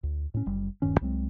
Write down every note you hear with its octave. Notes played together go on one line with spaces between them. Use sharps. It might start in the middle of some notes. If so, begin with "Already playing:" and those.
D2
A2 C#4
F#1 G3
D#1 G2 D#3 C#4
C2 F#3 G#3 C4